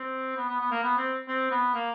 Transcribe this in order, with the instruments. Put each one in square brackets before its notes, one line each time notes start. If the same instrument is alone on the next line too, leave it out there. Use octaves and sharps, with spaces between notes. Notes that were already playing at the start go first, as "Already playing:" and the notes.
Already playing: [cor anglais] C4
B3
B3
B3
A#3
B3
C4
C4
B3
A#3